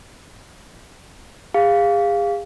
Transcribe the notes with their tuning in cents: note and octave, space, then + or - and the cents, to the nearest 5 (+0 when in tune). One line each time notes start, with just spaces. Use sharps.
G#4 -40 F5 +0